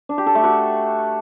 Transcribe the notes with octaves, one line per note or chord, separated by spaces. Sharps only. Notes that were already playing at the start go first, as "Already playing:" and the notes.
D4
G4
A4
A3
F#4